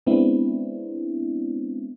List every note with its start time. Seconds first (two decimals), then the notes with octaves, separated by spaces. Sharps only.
0.07 G#3 B3 C4 D4 E4